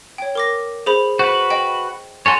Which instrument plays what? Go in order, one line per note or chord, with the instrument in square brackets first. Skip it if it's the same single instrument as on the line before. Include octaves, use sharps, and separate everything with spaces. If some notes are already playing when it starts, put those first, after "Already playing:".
[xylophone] C#5 G5
A#4 D6 A#6
G#4 C5 B5
[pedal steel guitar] F#4 B4 [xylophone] C5
[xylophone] D#5 G5
[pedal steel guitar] F#4 A4 C#5 [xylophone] G#5 C6